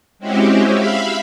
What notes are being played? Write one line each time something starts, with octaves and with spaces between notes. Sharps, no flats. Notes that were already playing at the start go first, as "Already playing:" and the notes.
G#3 C4 C#4 E4 F#4 G4
E5 F5 B5